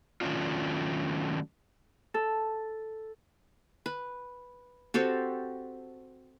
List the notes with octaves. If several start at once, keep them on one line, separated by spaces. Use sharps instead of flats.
D#3 F#3 A3 C#4 D4 F4
A4
B4
C4 F#4 G4 A4